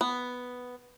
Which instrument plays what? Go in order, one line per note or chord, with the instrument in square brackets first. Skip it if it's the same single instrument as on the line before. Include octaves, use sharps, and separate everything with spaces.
[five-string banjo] B3